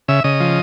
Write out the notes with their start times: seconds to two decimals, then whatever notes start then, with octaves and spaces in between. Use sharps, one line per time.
0.08 C#3 E5
0.24 C#3 D#5
0.40 F3